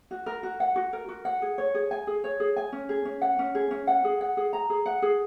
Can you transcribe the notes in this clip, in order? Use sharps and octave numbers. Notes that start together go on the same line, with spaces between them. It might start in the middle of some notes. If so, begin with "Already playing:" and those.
F#4
A#4
F#4
F#5
F#4
A#4
F#4
F#5
G#4
C#5
G#4
G#5
G#4
C#5
G#4
G#5
C#4
G#4
C#4
F#5
C#4
G#4
C#4
F#5
G#4
F#5
G#4
A#5
G#4
F#5
G#4